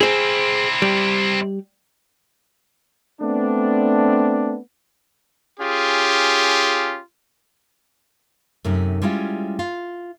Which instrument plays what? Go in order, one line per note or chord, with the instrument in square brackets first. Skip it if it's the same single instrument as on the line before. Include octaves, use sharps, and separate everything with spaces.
[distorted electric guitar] C4 E4 [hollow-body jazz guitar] G#4 C5
[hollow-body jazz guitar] G3
[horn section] A3 B3 C4 D4
[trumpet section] C#4 F4 G4 G#4
[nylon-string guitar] F#2 C3 A3 D#4
G3 G#3 C#4 E4 F4
F4